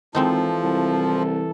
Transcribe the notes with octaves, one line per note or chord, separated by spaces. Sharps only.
G#1 E3 F3 G#3 C4 D#4 A4
C2